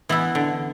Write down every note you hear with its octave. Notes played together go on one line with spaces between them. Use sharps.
E3 B3 E4
D3